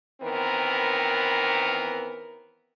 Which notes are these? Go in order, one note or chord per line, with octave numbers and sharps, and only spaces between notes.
D#3 E3 B3 C4 A#4